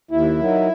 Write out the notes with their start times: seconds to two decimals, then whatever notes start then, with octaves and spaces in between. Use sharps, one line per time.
0.11 D#2 E4
0.39 D#3 F#3